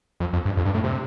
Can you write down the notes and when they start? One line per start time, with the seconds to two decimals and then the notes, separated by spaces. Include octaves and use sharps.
0.20 F2
0.33 F2
0.45 G2
0.57 F2
0.65 G2
0.74 A2
0.84 C3